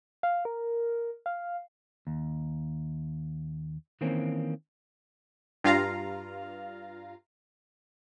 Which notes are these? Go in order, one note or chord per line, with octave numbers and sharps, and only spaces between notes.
F5
A#4
F5
D#2
D#3 E3 A#3 C4 C#4
G2 F4 F5 A#5